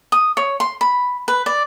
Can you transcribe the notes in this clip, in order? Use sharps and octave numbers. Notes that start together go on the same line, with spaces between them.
D#6
C#5
C6
B5
B4
D5